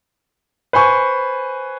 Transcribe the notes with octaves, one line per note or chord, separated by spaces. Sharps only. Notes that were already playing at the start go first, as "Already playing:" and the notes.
B4 C5 G#5 C#6